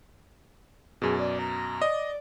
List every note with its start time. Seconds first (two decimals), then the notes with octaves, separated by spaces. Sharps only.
1.02 F#2 B2 G#4
1.19 D5
1.39 A#5
1.82 D5 D#5